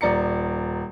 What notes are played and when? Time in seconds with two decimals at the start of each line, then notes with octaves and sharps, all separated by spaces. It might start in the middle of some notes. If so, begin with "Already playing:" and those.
0.01 D#1 D5 A#5 C#7